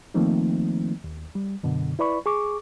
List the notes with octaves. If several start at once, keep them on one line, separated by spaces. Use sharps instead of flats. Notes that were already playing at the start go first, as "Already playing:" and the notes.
D#3 F3 A3 A#3 C4 D#4
D#2
G3
F#2 B2 D3
E4 B4 D5 B5 C#6
G#4 C#6 D6